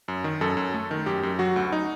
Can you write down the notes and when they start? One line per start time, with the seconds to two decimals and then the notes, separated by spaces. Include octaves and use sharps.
0.08 F#2
0.24 D#3
0.41 F#2 A4
0.57 F#2
0.74 A3
0.91 D#3
1.06 F#2 G4
1.23 F#2
1.39 F#3 F#4
1.56 D2
1.72 D#4